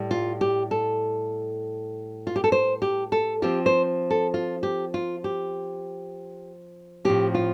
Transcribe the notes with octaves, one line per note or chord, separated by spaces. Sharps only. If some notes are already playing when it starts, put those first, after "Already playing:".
Already playing: A2 G3
F4
G4
A4
F4
G4
A4
C5
G4
A4
F3 C4 F4 G4
C5
A4
F4
G4
F4
G4
A2 F3 C4 G4
F4